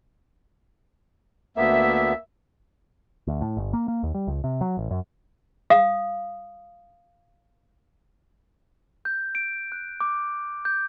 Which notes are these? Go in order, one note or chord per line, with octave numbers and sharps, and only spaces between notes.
D2 A#3 B3 E5
D2
A2
G1
A#3
A#3
D#2
G3
C#2
C3
F#3
A1
F#2
F5 D#6
G6
D7
F#6
D6
G6